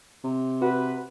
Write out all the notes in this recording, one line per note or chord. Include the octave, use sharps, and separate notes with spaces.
C3
F#4 B4